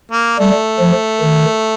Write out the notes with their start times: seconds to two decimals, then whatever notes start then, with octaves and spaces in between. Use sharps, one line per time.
0.11 A#3
0.39 G3 A3
0.79 F3
1.21 D#3